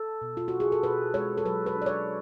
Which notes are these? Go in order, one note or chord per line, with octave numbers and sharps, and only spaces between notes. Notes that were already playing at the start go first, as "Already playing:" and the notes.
Already playing: A4
B2
F4
D4 F#4
G#4
A4
B2 B4
G#3 C#5
A4
F#3 B4
B4
D4
D5
C#5